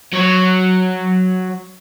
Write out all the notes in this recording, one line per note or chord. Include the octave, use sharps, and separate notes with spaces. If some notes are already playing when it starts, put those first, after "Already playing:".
F#3 C#5